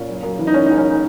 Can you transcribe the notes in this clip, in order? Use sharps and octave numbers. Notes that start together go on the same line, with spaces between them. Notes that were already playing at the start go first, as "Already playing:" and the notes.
Already playing: A#2 C#4
F#1
F#2
E3
D#4
F#1 C#4
D#4
F#1
C#4
D#4